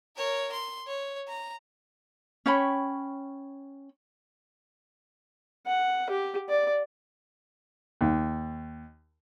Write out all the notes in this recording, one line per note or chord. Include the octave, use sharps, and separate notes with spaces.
A#4 C#5
C6
C#5
A#5
C#4 C#5 G5 B5
F#5
G4
D5
D#2